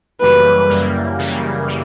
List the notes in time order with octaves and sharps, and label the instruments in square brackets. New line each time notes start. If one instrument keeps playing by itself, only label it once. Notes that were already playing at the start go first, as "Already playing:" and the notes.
[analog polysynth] F#2 C#3 E3 G3 A#3 [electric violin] B4
[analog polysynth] F#2 C#3 E3 G3 A#3
F#2 C#3 E3 G3 A#3
C#3 E3 G3 A#3